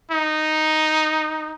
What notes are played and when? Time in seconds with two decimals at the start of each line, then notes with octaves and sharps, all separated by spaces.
0.11 D#4